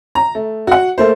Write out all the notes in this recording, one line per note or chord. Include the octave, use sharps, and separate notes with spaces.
A#5
A3
F#4 F#5
A3 A#3 C5